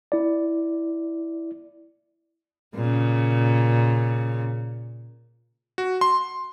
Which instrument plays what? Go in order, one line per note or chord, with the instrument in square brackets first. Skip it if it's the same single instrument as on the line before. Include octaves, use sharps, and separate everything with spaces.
[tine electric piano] E4 D5
[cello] A#2 C#3
[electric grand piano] F#4
C6